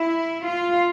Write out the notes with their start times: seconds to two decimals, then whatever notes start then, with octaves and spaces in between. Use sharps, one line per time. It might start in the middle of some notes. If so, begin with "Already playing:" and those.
Already playing: E4
0.44 F4